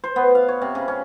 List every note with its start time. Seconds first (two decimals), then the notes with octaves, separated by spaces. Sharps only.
0.04 C5
0.16 B3
0.35 F5
0.48 C#5
0.62 C3
0.75 C#3
0.88 C#4